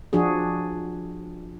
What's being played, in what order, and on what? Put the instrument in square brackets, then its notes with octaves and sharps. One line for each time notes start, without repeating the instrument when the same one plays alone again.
[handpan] F3 D4 F#4 G#4